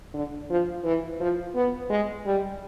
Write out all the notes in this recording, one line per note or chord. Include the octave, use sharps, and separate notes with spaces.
D3
F3
E3
F3
B3
G#3
G3